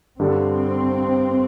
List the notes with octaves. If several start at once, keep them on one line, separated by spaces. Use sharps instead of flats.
G2 D3 G3 C4 D4 A4